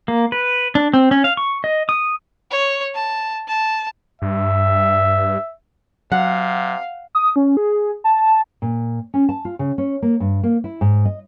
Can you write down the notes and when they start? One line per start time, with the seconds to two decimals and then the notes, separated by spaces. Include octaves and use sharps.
0.08 A#3
0.32 B4
0.75 D4
0.94 C4
1.11 C#4
1.24 F5
1.37 C#6
1.64 D#5
1.89 D#6
2.51 C#5
2.94 A5
3.47 A5
4.22 G2 E5
6.12 C3 F#3 F5 F#5
7.15 D#6
7.36 C#4
7.57 G#4
8.04 A5
8.62 A#2
9.14 C#4
9.29 A5
9.45 F4
9.59 C#3
9.78 C#4
10.02 A#3
10.20 G2
10.43 A#3
10.64 E4
10.81 G#2
11.05 D#5